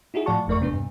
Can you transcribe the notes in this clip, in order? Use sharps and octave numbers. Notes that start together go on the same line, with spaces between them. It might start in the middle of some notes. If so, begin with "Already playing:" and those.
D#4 E4 F#4 G#4
A2 F3 D5 F#5 A5 C#6
G1 F2 A3 A#4 D5 C#6
E2 C3 B3 D4 B4
G2 C3